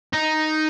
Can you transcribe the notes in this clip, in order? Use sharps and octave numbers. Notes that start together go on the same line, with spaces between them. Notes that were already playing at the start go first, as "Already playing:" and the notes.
D#4